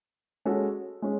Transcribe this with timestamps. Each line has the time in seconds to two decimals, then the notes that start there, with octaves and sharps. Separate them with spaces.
0.45 G#3 C#4 F#4 A4
1.02 G#3 C#4